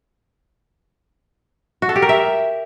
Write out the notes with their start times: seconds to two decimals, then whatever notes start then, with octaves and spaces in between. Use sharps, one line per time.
1.82 F#4
1.89 A4
1.96 G4
2.02 A#4
2.09 E5